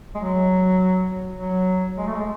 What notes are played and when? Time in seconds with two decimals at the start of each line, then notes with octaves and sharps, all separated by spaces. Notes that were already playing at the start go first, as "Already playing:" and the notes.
0.15 G#3
0.18 F#3
1.37 F#3
1.98 G#3
2.07 A3
2.14 G#3